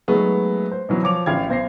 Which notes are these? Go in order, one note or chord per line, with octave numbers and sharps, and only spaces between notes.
F#3 G#3 A3 B3 D#4 G#4
C5
B2 E3 F#3
F3 C#5 D6 F7
A1 F5 G5 G#6
B1 C5 A#6 C7